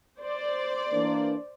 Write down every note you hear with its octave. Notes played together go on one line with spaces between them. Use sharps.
C5 D5
E3 A#3 D4